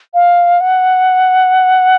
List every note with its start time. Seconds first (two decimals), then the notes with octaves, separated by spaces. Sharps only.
0.14 F5
0.60 F#5